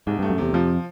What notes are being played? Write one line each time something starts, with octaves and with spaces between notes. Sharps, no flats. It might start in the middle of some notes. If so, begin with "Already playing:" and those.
C2 G#2
G2 A3
F#2
E2 C3
F2 F3